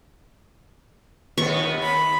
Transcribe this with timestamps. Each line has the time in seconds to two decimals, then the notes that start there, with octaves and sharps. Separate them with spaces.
1.38 D#2 B3 C#6
1.82 B5